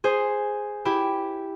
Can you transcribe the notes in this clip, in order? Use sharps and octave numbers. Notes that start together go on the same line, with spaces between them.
G#4 C5
E4 G4